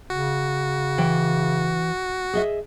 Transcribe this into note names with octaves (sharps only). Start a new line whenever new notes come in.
C#3 F#4
E3 G5
G#4 D#5 E5